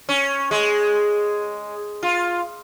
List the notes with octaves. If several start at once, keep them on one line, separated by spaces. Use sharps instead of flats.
C#4
G#3
F4